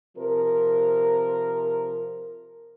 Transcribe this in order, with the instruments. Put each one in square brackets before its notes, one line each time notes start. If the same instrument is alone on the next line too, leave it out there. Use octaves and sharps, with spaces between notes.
[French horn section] C3 F3 A#4